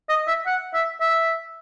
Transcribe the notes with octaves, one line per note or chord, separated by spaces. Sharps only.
D#5
E5
F#5
E5
E5